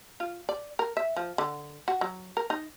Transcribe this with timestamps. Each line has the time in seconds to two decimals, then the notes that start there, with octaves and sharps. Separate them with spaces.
0.20 F4
0.49 D5
0.79 A#4
0.97 E5
1.16 F3
1.38 D3
1.88 F#4
2.01 F#3
2.37 A#4
2.50 D#4